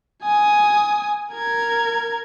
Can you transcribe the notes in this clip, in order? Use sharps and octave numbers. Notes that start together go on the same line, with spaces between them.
G#5 D#6
A#4 G#6